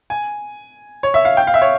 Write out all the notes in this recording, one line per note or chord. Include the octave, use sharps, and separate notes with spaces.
G#5
C#5
E5
F5
G5
F5
E5
C#5